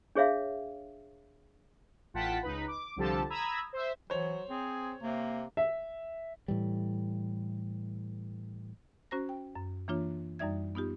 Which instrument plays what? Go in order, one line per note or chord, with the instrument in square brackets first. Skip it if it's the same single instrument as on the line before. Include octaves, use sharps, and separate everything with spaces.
[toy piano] D4 G#4 C#5 E5 F5
[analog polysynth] A1 F4 F#5 G5 A5 B6
C#2 D#4 B4 B5
D6
C2 D3 F3 G4 A4 A5
A#5 B5 D#6 E6 G#6
C5 E5
[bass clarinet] E3 [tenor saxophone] F#3 [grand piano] C5 C#5
[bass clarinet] C4 [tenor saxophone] G#4
[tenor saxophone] C3 [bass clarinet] A#3
[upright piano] E5
[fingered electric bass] A2 E3 G3
[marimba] C#4 F#4 C5 A#5 A#6
G5
F#2
E3 A#3 D4 F4 C#5
F#2 G3 D#4 D5 E5 G#6
B3 D#4 F4 G4